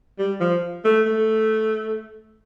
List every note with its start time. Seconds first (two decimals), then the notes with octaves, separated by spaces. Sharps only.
0.19 G3
0.40 F3
0.85 A3
1.06 A3